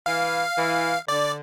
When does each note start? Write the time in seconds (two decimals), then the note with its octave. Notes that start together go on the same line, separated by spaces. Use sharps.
0.06 E3 F5
0.58 E3
1.08 D3 D5